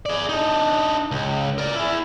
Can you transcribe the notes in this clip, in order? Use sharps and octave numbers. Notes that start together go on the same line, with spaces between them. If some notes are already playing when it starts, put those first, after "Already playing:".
G#4 D5
D4 D#4
C#2
A#4 D5
E4 G#4